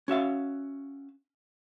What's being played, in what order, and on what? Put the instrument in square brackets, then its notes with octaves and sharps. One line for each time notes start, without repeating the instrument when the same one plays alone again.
[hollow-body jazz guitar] C#4 F#4 E5 F5